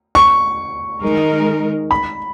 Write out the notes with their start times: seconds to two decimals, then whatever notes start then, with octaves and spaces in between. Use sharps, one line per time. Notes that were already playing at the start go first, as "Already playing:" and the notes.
0.15 C#6
1.03 D#3 G#3 D#4 A#4
1.91 B5